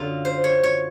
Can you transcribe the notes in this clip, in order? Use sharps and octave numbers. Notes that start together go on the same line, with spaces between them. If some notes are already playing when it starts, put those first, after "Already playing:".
Already playing: F#2 D3 F#3 F4
C5
C#5
C#5